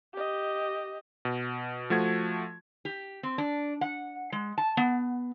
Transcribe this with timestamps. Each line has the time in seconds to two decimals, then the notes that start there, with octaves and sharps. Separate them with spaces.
0.14 G4 D#5
1.25 B2
1.90 F3 A3 F#4 G#6
2.85 G4
3.23 C4
3.38 D4
3.81 F#5
4.32 G#3
4.58 A5
4.77 B3